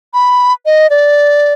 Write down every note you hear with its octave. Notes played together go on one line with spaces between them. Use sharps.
B5
D#5
D5